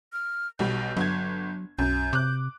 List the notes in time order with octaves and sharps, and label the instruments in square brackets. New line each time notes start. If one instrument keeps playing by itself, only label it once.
[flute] F6
[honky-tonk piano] B1 B2 G3 [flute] G6
[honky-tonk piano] G1 G#6 [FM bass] F#3
[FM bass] B1 [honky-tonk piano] F#2 [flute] G6
[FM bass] C3 [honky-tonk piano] D6 F#6